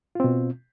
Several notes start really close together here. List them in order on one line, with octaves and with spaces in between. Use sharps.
F4 C4 B2